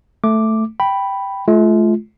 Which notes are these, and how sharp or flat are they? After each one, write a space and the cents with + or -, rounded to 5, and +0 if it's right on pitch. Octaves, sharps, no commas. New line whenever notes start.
A3 +0 D6 +0
G5 +0 B5 +0
A3 -45 F4 -10